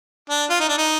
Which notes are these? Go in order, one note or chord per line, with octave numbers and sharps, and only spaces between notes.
D4
F4
D#4
D4
D#4